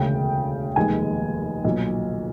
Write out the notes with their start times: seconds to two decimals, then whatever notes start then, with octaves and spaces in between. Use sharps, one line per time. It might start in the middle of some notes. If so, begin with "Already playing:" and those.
Already playing: E1 D2 C#3 G5
0.76 F1 D#2 D#3 G#3 G#5
1.64 B1 A#2 F#3